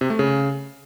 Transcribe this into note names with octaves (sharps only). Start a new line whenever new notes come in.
C3
A3
C#3